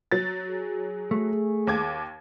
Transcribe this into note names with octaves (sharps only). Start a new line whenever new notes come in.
F#3 A6
G#4
A3
D#2 D6 G#6